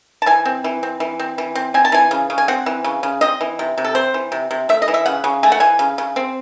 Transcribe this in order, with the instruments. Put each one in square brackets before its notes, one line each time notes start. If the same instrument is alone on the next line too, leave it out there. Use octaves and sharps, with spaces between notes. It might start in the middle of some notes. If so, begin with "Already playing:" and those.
[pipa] A5
E3 G#5
C4
E3
C4
E3
C4
E3
C4
C4 G#5
A5
E3 G#5
C#3
C#3
G#5
C4 F#5
E3
C#3
C#3
C4 D#5
E3
C3
C3
A4
C4 C5
E3
C3
C3
A3 E5
D#5
E3
E5
C#3 F#5
C#3
A3 G#5
F#5
E3 G#5
C#3
C#3
C4